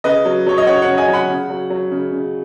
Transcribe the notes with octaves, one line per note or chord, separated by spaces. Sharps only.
C#3 B4 D#5
F#3
F#3 C#5
D#5
C#3 C#5 F#5
C#5 F#5
C#3
D#5 G#5
F#3
F#5 B5
C#3
F#3
F#3
C#3
C#3